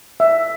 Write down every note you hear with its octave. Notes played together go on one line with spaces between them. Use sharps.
E5